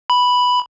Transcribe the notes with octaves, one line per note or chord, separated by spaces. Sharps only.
B5